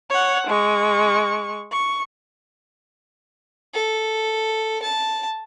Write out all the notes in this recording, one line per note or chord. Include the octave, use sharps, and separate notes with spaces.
C#5 F#5
G#3 C#6
C#6
A4
A5